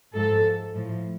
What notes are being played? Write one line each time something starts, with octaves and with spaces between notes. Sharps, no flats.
G#2 F3 A4
A2 F3